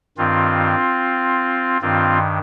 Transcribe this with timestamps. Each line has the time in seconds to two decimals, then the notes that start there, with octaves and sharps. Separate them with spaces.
0.18 G2 D#3 C4 F4
1.81 G2 D#3 C4 F4